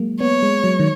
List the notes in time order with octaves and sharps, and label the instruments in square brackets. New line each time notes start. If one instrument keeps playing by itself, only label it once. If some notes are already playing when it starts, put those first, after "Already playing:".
Already playing: [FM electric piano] F#3 G#3 A#3
[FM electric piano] B3 [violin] C#5
[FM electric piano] G#3
F#3
D#3